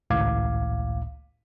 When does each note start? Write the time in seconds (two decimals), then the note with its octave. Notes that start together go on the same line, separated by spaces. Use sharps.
0.10 G#1 C#2 A2 F5 D6 G#6